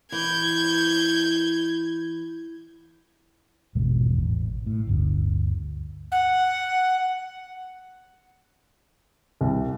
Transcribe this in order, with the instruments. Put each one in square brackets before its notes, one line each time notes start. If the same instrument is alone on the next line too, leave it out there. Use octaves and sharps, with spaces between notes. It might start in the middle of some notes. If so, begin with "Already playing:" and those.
[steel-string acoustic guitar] E3 [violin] G6 G#6
[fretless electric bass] G#1 E2 B2 G#3
A1
A2
G1 D2
[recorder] F#5
[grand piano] C2